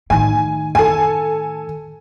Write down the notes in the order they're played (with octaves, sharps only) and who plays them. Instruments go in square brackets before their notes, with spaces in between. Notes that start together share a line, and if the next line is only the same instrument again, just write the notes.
[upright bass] A2 D#3 [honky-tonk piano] G#5
[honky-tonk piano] A4 G#5